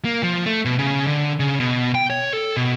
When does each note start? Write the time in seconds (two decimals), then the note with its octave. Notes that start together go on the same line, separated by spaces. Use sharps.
0.05 A#3
0.23 F3
0.46 A3
0.65 B2
0.79 C#3
1.07 D3
1.40 C#3
1.60 B2
1.95 G5
2.10 C#5
2.33 A4
2.57 B2